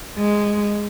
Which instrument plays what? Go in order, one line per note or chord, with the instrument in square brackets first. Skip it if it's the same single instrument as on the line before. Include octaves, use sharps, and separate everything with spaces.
[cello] G#3